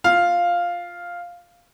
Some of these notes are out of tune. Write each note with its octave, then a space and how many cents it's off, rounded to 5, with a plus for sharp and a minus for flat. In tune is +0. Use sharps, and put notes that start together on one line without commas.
F4 +5 F5 +0